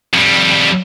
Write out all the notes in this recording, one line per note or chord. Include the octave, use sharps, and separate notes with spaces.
F2 G3